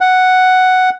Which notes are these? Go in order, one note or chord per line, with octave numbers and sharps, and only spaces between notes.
F#5